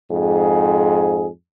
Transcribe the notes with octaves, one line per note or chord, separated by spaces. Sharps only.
F2 G#2 G#4